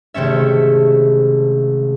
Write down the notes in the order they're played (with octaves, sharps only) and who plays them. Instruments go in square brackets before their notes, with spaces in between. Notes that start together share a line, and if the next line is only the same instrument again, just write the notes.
[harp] G#1 C3 A3 C#4 E5